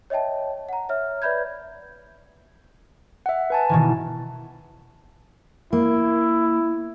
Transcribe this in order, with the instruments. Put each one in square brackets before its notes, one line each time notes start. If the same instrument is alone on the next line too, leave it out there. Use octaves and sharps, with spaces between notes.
[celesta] C#5 D#5 E5 G5 A5
F#5 A#5
C#5 E5 F6
B4 D5 E5 B5 G6 G#6
[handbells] E5 F#5
B4 G#5 A5
[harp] B2 D#3 E3
[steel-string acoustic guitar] A#3 [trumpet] E4